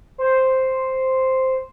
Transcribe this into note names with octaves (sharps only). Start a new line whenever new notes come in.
C5